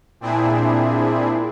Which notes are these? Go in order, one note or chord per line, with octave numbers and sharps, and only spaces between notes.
A#2 C4 D4 E4 G#4